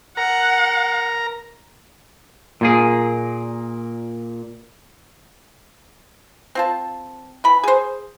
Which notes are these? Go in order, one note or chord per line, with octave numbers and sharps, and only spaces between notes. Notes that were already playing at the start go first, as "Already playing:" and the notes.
A#4 F#5 A#5
A#2 A#3 G#4
C4 F4 A5
E3 B5
G#4 C5